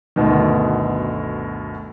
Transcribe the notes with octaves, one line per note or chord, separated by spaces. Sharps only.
G1 D2 B2 D#3